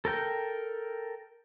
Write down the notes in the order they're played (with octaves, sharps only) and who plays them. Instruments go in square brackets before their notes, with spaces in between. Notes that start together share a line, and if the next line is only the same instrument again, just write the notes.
[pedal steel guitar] A4 A#4 G5